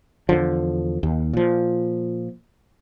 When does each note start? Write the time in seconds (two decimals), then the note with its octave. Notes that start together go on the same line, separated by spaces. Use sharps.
0.29 E2 D3 F3
1.03 D#2
1.33 A#2 F3